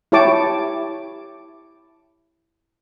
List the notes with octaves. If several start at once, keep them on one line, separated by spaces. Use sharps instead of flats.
E4 G4 C#5 A5 D6